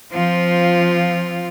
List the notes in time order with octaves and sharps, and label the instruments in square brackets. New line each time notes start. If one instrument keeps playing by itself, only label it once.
[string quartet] F3 C4 F4